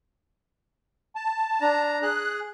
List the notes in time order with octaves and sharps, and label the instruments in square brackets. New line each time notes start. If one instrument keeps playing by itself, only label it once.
[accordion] A5
[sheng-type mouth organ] D4 A#5
[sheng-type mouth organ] G#4 [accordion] F#6